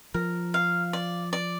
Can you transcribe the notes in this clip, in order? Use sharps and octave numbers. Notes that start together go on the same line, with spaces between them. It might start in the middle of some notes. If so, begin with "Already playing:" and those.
F3 A#4
F5
D5
D5